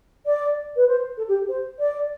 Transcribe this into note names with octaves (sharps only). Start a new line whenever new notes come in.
D5
B4
C5
A4
G4
C5
D5